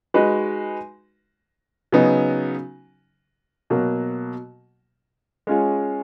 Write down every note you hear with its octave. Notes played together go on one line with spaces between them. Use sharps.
G#3 D#4 F#4 B4
C#3 F#3 B3 D#4
B2 F#3 A#3
G#3 C#4 F4 G#4 C#5